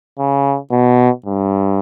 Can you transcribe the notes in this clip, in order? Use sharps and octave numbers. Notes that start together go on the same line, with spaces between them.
C#3
B2
G2